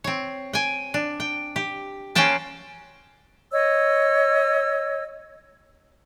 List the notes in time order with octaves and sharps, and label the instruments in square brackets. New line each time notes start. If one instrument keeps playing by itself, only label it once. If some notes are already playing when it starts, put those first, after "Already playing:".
[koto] C4 C#5
G5 G#5
D4
G5
G4
A#3 C#4 F#4 C5 G5 A5
[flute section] C#5 D#5 E6